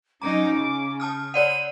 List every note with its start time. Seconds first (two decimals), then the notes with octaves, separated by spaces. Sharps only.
0.22 F#3 C#4 D#4 A#5 D6
0.52 C#3
1.00 A5 D#6 F6
1.34 C#5 D5 F#5 D#7